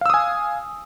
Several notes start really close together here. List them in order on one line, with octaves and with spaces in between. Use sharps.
F5 E6 D#6 G#5